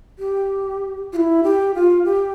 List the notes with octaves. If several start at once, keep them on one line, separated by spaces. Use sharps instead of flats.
G4
F4
E4
G4
F4
G4